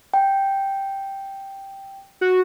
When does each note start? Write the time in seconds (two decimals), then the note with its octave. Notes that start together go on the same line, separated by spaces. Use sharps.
0.14 G5
2.21 F#4